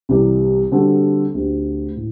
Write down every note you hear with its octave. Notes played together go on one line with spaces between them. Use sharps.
C2 C3 E3 G3
D3 G3 C4 F#4 A4
D2 D3 A3 C4 G4
A2